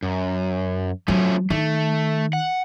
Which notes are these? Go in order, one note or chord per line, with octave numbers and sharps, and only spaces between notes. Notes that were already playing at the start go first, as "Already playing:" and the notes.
F#2
F3 F#3 A3 C#4
D#3 A3
F#5